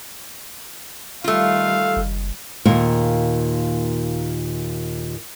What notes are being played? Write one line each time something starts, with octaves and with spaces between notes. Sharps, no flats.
D#3 G3 A3 F4 F5
F#1
D#2 A#2 A#4